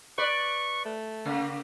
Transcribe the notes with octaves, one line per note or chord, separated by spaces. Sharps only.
B4 D5 C#6
A3
C#3 A#3